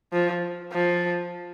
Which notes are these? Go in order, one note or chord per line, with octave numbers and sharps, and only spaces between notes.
F3
F3